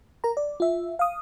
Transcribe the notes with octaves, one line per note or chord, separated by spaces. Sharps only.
A#4 A#5
D5
F4 E5
F5 D#6